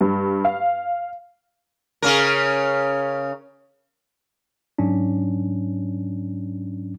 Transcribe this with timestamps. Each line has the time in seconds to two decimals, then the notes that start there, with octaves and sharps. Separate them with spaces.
0.01 G2
0.45 F5
2.02 C#3 C#4 A#4
4.78 G#2 F#3 C#4 D4